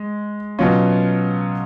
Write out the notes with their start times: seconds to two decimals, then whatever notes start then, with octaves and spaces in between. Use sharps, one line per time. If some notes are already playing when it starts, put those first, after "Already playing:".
Already playing: G#3
0.59 B2 F#3 C#4 F4